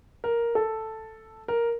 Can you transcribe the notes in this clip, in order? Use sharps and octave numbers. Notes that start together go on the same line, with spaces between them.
A#4
A4
A#4